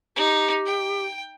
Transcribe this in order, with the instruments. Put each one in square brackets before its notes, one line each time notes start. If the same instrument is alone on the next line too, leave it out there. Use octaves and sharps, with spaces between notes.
[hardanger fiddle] D#4 [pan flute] G4
[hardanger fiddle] G5